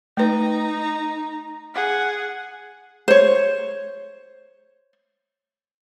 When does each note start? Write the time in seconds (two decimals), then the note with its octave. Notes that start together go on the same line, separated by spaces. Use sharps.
0.17 A3 D#4 B4 A#5
1.74 G#4 F#5
3.08 C5 C#5